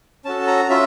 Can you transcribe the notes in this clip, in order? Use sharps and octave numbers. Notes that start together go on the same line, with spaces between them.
C#4 F#4 A4 A5
A#5
C#4 F4 E5